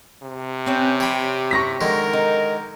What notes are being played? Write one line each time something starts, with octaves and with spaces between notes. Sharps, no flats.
C3
C4 C#4 B4
G4 C#5 B5
C#6 A#6 B6
D3 D#3 G#3 A#4
D#4